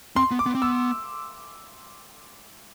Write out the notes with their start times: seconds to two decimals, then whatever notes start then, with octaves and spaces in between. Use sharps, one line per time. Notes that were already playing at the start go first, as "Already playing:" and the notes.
0.16 C4 C6
0.31 B3
0.39 D6
0.46 B3
0.55 C4
0.62 B3 E6